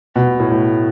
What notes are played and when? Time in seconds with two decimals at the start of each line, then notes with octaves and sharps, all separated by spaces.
0.16 B2
0.40 A2
0.51 A2